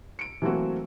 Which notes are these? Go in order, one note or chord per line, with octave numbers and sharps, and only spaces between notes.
C#7 D7
E3 F#3 A3 A#3 C4 F#4